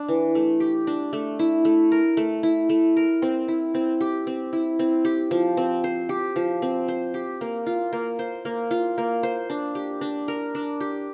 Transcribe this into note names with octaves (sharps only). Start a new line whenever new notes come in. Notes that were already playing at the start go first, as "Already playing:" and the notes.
Already playing: D4
E3
A3
G4
D4
A3
E4
A3
A#4
A3
E4
A3
A#4
C4
E4
C4
G4
C4
E4
C4
G4
F3
C4
C5
G4
F3
C4
C5
G4
A#3
F4
A#3
C5
A#3
F4
A#3
C5
D4
G4
D4
A#4
D4
G4